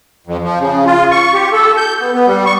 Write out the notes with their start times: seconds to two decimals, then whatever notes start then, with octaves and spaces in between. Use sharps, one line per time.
0.27 F2
0.44 F3
0.60 C#3
0.86 F4
1.11 C#6
1.34 G4
1.53 A4
1.77 G6
2.00 B3
2.14 B3
2.27 G3
2.46 C#6